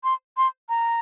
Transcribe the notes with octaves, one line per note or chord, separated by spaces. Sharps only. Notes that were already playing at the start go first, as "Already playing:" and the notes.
C6
C6
A#5